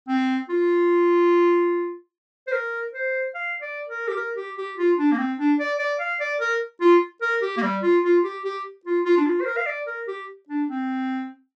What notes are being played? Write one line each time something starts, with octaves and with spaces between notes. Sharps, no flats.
C4
F4
C5
A#4
C5
F5
D5
A#4
G4
A#4
G4
G4
F4
D4
A#3
C4
D4
D5
D5
F5
D5
A#4
F4
A#4
G4
A#3
G3
F4
F4
G4
G4
F4
F4
D4
F4
C5
A#4
F5
D5
A#4
G4
D4
C4